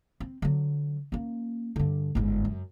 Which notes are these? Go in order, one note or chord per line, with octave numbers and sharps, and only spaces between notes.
C4
D3 F#3
A#3 C#4
G2 D3
G1 G#2
F#2